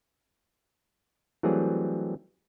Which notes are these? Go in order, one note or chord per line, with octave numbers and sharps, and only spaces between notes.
E3 F#3 G3 A3 C4 G#4